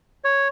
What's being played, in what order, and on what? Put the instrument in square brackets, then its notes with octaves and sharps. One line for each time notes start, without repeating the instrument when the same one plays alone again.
[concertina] C#5